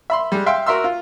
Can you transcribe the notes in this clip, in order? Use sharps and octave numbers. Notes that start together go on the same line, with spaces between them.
E5 B5 C6
G3 G#3
E5 F5 G5 C6
F#4 A#4 E5 C6 E6
F4